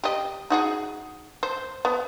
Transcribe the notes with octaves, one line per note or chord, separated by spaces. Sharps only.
G4 D#5
D#4 F#4 G#4
C5
B3